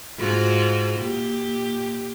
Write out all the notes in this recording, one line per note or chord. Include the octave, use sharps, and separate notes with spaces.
G#2 F4 F#4
A#2 G4